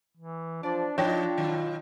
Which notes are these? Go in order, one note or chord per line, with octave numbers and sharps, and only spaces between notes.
E3
F3 D4 D5
F3 D4 D#4 F4 F#4 C#5 G5 A#6
B2 D#3 F#3